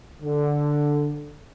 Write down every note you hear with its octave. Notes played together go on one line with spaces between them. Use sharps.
D3